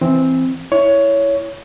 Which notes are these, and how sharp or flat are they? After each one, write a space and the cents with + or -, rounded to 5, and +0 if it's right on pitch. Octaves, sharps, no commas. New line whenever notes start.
E3 +0 C4 +0
E4 +0 C#5 +15